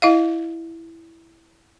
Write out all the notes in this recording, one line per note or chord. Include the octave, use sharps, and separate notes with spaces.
E4 D#5 F5